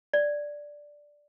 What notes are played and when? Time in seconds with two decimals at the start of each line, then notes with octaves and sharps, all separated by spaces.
0.13 D5